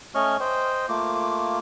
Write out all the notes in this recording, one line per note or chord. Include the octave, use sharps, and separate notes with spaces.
A3 C#4 C#5 D#5 C#6 F6
C5 D#5 G5
A3 A#3 F4 D6